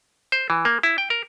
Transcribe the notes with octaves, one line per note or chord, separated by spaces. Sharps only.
C5
E3
A#3
E4
G5
A#4